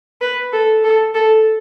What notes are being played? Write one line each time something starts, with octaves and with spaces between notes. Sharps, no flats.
B4
A4
A4
A4